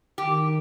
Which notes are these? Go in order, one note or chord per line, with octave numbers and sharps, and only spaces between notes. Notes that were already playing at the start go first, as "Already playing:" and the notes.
D#3 G4